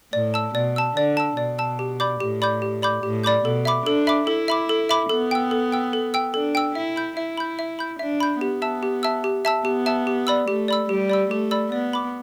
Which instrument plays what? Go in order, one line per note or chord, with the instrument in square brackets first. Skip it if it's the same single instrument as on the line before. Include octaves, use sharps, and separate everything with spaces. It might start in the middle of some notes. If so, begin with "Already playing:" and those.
[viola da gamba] A2 [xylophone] D5
[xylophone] A5 E6
[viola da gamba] B2 [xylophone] D5
[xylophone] A5 E6
[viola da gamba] D3 [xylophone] D5
[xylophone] A5 E6
[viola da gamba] B2 [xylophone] D5
[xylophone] A5 E6
G4
D5 B5 D6 G6
[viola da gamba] A2 [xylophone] G4
[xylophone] D5 B5 D6 G6
G4
D5 B5 D6 G6
[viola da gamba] A2 [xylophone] G4
[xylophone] D5 B5 D6 G6
[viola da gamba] B2 [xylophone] A4
[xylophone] E5 B5 D6
[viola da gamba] D4 [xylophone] A4
[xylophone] E5 B5 D6
[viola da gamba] E4 [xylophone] A4
[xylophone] E5 B5 D6
A4
E5 B5 D6
[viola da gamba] B3 [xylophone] A4
[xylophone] G5 E6
A4
G5 E6
A4
G5 E6
[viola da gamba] D4 [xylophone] A4
[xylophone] G5 E6
[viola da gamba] E4 [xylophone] E5
[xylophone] B5 G6
[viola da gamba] E4 [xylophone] E5
[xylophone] B5 G6
E5
B5 G6
[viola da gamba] D4 [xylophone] E5
[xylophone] B5 G6
[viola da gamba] B3 [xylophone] G4
[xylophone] E5 A5 E6
G4
E5 A5 E6
G4
E5 A5 E6
[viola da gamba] B3 [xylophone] G4
[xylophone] E5 A5 E6
G4
D5 B5 E6
[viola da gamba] A3 [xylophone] G4
[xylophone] D5 B5 E6
[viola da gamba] G3 [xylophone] G4
[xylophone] D5 B5 E6
[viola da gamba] A3 [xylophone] G4
[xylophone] D5 B5 E6
[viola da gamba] B3 [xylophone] D5
[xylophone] B5 D6